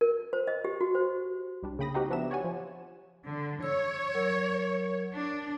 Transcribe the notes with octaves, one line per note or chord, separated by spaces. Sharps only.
A#4
C5
D#5
G4
F#4
C5
C2 G3 D4
C#3 A#3 G5 B5 D#6 A#6
C4 D#4 F#4 G4 F#5
F3 B3 D4 E5 E7
G4 C#5 D5 F#5 G#5
F3
D3
C#5 E6
F#3 A#4
D4